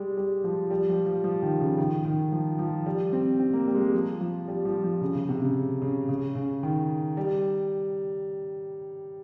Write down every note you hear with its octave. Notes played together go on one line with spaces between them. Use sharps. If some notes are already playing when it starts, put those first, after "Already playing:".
Already playing: G3 G#3
G3
F3
G3
F3
F3
F3
D#3
C#3
D#3
D#3
F3
F3
G3
C4
C4
A#3
G3
G#3
G3
F3
F3
G3
F3
F3
C#3
C#3
C3
C#3
C#3
C#3
C#3
D#3
G3